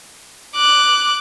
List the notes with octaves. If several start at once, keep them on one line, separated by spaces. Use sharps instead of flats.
D6 F#6